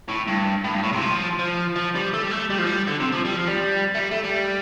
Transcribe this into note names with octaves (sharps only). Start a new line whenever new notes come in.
A2
G2
A2
G2
A2
C3
F3
F3
F3
G3
A3
G3
A3
G3
F3
G3
D3
C3
F3
G3
F3
G3
A3
G3
A3
G3